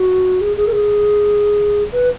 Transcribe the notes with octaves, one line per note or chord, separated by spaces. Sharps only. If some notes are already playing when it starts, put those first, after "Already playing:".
Already playing: F#4
G#4
G#4
A#4
G#4
B4